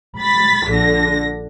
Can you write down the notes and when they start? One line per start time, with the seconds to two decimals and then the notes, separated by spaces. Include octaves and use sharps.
0.19 B5 A6 B6
0.69 A#1 D3 A#6